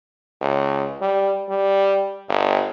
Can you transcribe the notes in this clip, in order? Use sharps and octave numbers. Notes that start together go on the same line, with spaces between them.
C#2
G3
G3
G1